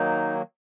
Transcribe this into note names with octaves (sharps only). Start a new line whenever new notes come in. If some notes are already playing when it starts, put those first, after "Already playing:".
Already playing: D#3 F#3 A#3 D#4